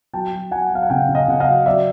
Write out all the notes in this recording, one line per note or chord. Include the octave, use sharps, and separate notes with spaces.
F#3 G5 A5
F#3
F#3 F#5 G#5
F#3 F5
F#5
C#3 F5 G5
C#3
D#5 F5
C#3 F#5
D#5 F5
F#3
F#3 D5 E5